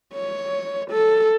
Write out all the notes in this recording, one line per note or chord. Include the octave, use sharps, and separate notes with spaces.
C#5
A4